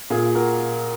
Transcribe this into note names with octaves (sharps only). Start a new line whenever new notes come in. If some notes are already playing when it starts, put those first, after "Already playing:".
A#2 F4 G#4
F#4 A#4